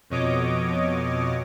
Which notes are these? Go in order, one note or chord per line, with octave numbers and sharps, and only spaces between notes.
F2 B2 C#5 D#5 D6